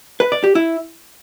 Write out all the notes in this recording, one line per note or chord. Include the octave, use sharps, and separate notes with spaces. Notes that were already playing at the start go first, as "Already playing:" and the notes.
B4
D5
G4
E4